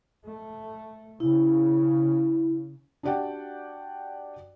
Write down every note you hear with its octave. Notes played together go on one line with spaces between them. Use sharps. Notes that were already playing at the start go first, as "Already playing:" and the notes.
A3
C#3 E4
D4 F#4 G4 D5 F#5 G5